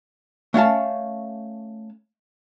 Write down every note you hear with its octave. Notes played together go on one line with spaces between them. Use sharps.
A3 C#4 F5 A5